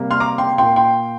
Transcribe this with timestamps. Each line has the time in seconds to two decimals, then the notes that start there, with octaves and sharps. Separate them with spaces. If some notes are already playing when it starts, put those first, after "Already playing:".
Already playing: C3 G3 A#3
0.11 C6 F6
0.20 A#5 D6
0.38 G5 C6
0.57 A#2 A#3 G5 C6
0.76 G5 C6